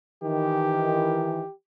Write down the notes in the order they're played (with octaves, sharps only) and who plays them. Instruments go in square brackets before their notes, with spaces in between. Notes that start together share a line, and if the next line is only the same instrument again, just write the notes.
[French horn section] D#3 E3 [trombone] G4